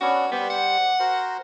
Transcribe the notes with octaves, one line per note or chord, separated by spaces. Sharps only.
B3 C#4 D4 F#4
G3 B3 G4 C5
F#5
F#4 A#4 C5